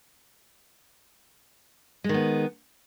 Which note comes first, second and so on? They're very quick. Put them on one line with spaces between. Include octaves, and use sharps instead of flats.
G#3 D#3 B3